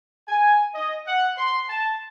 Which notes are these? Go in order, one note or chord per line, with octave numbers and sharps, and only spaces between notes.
G#5
D#5
F#5
C6
A5